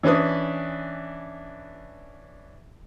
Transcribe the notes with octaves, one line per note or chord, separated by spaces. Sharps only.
E3 C#4 D4 B4 D#6